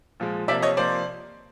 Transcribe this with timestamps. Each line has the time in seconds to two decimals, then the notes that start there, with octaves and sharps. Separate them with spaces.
0.20 A#2 F3 G#3
0.48 C3 F3 A#3 D5 E5
0.62 C#5 D#5
0.77 C3 F3 A#3 C5 D5